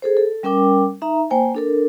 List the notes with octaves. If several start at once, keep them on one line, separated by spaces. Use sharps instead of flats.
G#4 A4 C5
A4
G3 C#4 A#4 G5 D6
D#4 E5 A#5
A#3 C5 G5 G#5
D4 A4 A#4